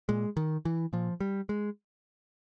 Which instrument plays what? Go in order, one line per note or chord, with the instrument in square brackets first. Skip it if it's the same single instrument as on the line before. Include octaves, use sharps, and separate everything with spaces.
[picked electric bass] A#2 G#3
D#3
E3
A#2 F3
G3
G#3